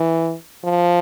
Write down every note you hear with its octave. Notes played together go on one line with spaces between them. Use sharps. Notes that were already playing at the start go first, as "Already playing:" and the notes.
Already playing: E3
F3